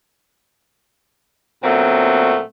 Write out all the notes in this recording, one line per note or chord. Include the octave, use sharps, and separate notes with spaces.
A#2 D3 F#3 A3 B3 C4